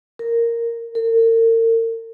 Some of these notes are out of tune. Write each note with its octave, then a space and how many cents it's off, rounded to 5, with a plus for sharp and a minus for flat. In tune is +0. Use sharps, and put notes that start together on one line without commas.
A#4 -5
A#4 -40